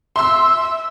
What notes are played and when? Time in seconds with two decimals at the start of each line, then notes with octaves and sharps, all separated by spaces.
0.16 E5 C6 E6